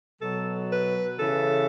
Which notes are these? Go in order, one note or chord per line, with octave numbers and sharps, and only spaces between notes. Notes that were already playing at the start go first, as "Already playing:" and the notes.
B2 F#3 A4
B4
C#3 E3 A4